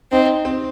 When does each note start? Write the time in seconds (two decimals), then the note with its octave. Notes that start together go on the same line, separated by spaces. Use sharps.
0.12 C4 D#4
0.45 C4